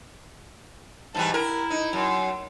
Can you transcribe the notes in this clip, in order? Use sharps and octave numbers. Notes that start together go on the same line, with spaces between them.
G#2 E3 G3 A5
E4 A#4
D#4
F#2